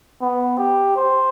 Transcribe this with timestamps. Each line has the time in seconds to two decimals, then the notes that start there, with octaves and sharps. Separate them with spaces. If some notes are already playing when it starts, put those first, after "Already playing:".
0.22 B3
0.58 G4
0.96 C5